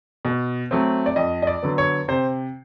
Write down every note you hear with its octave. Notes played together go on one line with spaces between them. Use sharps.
B2
F#3 A3 C4
D5
F2 D#5
D#5
D5
D3 F#3 B3
C#5
C3 C5